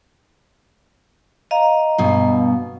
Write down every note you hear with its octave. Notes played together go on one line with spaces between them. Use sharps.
D#5 F5 A#5
G2 B2